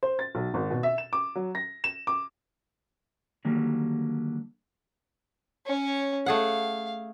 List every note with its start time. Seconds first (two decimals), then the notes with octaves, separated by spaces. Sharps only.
0.03 C5
0.19 A6
0.35 B1
0.54 G#1
0.70 B2
0.83 E5
0.98 E7
1.13 D6
1.35 F#3
1.55 A#6
1.84 E7
2.07 D6
3.45 D3 D#3 F#3 G3 A#3
5.66 C#4 C#5
6.26 A3 G#4 F5 F#5